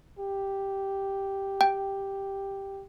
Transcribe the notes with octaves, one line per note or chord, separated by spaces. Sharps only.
G4
G5